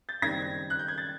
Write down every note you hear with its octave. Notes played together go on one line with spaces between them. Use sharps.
G6 A6
F#1 F#2 D#3 G3 C4 G#6 A#6
F#6
G6
G#6
A6